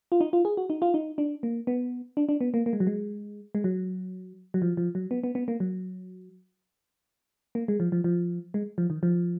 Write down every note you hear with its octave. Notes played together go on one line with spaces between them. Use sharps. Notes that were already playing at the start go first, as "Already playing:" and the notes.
F4
D#4
F4
G#4
F#4
D#4
F4
D#4
D4
A#3
B3
D4
D4
B3
A#3
A#3
G#3
F#3
G#3
G#3
F#3
F#3
F3
F3
F#3
B3
B3
B3
A#3
F#3
A#3
G#3
F3
F3
F3
G#3
F3
D#3
F3